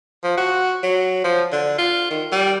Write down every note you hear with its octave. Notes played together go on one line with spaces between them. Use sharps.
F3
F#4
F#3
F3
D3
F4
D#3
G3